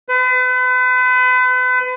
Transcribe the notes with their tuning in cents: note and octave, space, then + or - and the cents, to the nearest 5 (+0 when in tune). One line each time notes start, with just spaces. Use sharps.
B4 +40